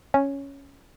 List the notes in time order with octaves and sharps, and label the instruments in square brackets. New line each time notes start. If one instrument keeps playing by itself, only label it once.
[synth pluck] C#4